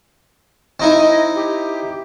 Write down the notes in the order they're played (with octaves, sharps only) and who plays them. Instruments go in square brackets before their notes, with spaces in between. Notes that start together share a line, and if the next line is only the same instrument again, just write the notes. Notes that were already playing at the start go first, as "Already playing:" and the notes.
[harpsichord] C4 D#4 E4 [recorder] D#5
[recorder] D#5
G4